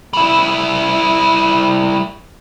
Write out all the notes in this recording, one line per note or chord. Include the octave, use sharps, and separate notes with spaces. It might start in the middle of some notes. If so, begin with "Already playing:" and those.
G3 E4